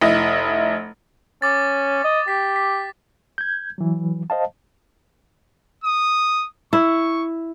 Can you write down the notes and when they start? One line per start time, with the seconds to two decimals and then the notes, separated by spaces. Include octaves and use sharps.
0.01 F1 E4 D#5
1.42 C#4 D6 A6
2.04 D#5
2.28 G4 B6
2.56 B6
3.38 G6 G#6
3.78 E3 F#3
4.30 C5 D#5 F5 A5
5.84 D#6
6.73 E4 C#6